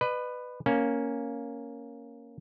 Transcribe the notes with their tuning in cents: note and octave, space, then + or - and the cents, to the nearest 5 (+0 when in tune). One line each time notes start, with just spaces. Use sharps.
B4 +10 D#5 -45
A#3 +0 C#4 +0